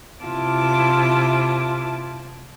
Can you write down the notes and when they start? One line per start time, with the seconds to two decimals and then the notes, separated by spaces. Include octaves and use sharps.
0.25 C3 E4 F4 A5 D6